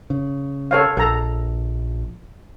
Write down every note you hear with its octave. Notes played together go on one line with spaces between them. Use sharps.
C#3
A4 C#5 F5
A#1 A4 A#5